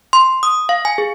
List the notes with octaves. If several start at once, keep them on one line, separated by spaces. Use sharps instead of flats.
C6
D#6
F5
G#5
G#4